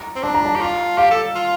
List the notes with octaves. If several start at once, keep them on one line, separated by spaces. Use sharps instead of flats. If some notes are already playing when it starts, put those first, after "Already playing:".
Already playing: A#5
C4
D4 A5
A#5
A5
G4
F4
G4 F5
A4
F4